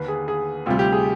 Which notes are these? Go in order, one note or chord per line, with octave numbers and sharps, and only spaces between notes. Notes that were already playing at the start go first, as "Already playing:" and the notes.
Already playing: D#2 D3 B4
G#4
G#4
D2 C3 G3 F4
G4
G#4